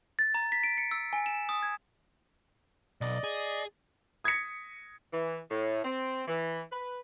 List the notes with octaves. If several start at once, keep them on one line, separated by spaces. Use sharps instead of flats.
A6
A#5
B6
D7
C#7
E6
G#5
E7
D#6
G#6
B1 D5 D#5
G#4
D#6 G#6 A#6 B6 C#7
E3
A2
C4
E3
B4